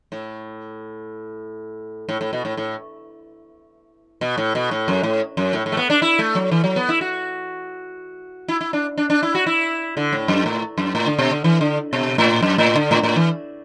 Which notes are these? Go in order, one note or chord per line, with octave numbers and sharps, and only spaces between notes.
A2
A2
A2
B2
A2
A2
B2
A2
B2
A2
F#2
A2
F#2
A2
A2
A3
B3
D4
E4
A3
F#3
E3
F#3
B3
E4
F#4
E4
E4
D4
D4
D4
E4
F#4
E4
D3
A2
F#2
A2
F#2
A2
D3
B2
D3
E3
D3
B2
A2
F#2
A2
D3
A2
A2
E3